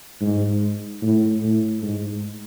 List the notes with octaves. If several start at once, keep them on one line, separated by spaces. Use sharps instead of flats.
G#2
A2
A2
G#2